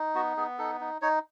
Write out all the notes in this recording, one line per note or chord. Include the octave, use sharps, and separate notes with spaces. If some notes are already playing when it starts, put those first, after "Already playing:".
Already playing: D#4
B3 F#4
B3 G#4
D#4 A4
D#4
D#4 C#5